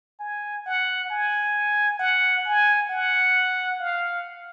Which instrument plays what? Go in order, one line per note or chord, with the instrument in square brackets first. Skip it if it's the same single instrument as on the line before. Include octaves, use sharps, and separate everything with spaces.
[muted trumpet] G#5
F#5
G#5
F#5
G#5
F#5
F5